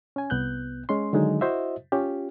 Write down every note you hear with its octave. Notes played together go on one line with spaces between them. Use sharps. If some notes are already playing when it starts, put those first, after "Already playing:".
C#4 G#5
C2 B3 F#6 G6
G#3 C#4 C6
D3 D#3 F#3 G#3 D#4
E4 F#4 C5 D#5 E5
C#4 F4 G4